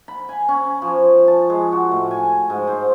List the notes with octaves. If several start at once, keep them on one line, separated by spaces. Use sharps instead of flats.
B5
G#5
C#4
F3
A5
G#3
F#4
A2
G#5
G#2
C5